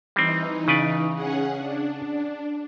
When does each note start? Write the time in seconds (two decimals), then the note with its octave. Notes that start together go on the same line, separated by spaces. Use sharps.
0.16 E3 G3 C4 D#4
0.68 C#3 B4 D5
1.15 C#4 G#4 F#5
1.57 D4